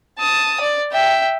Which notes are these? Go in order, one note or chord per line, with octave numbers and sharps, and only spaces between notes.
A5 D#6
D5
E5 G5